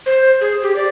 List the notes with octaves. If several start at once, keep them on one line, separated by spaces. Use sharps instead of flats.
C5
G#4
G4
D5